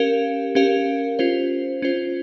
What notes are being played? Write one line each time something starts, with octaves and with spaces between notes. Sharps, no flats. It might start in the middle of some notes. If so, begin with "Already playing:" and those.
Already playing: C#4 G4 A#4 F5
C#4 G4 A#4 F5
C#4 F4 C5
C#4 F4 C5